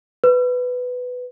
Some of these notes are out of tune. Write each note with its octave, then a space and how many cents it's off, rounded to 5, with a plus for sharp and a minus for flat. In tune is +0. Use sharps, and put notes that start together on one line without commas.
B4 +10